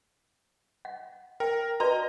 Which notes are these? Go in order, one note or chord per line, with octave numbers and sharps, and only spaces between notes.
F#5
A#4 G5
F#4 B4 D5 D#5 A#5